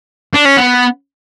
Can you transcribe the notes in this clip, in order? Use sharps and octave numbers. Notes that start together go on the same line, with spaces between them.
D4
C#4
B3